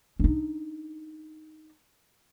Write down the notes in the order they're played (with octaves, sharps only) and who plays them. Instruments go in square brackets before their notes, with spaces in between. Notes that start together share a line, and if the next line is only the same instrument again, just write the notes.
[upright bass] D4 D#4